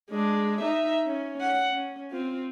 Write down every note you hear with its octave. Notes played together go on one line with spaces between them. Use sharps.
G#3 D4
D#4 E5
C#4
F#5
C#4
C4 F4